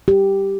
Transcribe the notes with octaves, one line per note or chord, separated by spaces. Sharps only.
G4